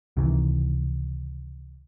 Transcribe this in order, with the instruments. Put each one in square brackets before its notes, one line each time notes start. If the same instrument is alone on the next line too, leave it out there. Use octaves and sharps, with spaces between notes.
[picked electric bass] C#2 C3 D#3 E3